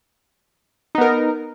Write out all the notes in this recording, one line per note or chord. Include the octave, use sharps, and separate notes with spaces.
B3 D#4 A#4